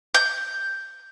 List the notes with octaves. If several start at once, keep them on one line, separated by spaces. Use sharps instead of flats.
G6